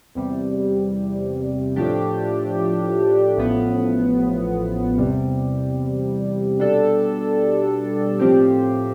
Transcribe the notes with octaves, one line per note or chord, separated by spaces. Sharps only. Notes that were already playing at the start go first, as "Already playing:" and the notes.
E2 C3 G3
A2 F3 A3 D4 G4
A1 A2 F3 B3
E2 C3 G3
B2 G3 D4 A4
A2 F3 C4 G4